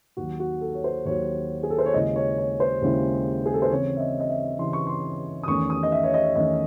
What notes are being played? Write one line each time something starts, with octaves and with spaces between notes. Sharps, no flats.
D#2 D#3 F#3 F#4
F#4
A4
C#5
C5
D#2 D#3 F#3 C#5
G#4
A4
C5
C#5
D#2 C#3 G#3 C#4 E4 D#5
C#5
C#5
C5
D#2 C#3 G#3 C#4 E4
G#4
A4
C5
C#3 E3 C4 C#5
E5
D#5
D#5
E5
C#3 E3 C4 C6
C#6
C6
D#6
E2 D#3 A3 C#4 C#6
D#6
D#5
E5
C#5
D#5
E2 D#3 A3 C#4 D#5